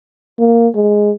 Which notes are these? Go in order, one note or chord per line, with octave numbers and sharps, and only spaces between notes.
A#3
G#3